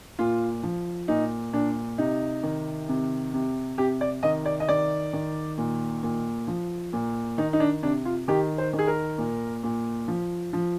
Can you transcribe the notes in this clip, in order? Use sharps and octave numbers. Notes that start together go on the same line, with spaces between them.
A#2 F4
F3
A#2 D#4
A#2 D4
C3 D#4
D#3
C3
C3
C3 G4
D5
D#3 D#5
D5
D#5
D#3 D5
D#3
A#2
A#2
F3
A#2
D#3 D#4
D#4
D4
C3 D4
F4
D#3 G4
C5
D#3
G#4
A#4
A#2
A#2
F3
F3